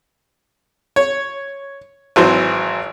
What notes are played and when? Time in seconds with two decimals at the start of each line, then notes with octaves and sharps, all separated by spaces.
0.96 C#5
2.16 G#1 E3 F#3 C5